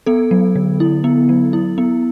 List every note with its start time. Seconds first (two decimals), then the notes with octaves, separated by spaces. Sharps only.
0.06 B3 A4
0.31 F#3
0.56 D3
0.80 E4
1.04 B3
1.29 F#3
1.53 E4
1.78 B3